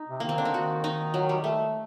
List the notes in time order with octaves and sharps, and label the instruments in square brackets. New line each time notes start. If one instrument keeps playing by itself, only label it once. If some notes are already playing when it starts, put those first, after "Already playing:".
Already playing: [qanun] D#4
[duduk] C3
[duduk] D#3 [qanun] A#3
[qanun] C4
[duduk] D3 [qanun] D4
[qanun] D#4
[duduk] D#3 [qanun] F#4
[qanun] D#4
F#3
G3
A3